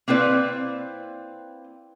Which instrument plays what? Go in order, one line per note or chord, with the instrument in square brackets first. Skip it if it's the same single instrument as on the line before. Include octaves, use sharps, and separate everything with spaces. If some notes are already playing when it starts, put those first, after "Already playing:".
[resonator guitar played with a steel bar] A#3 C4 E4 B4 D5